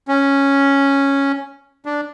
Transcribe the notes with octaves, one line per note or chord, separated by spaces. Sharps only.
C#4
D4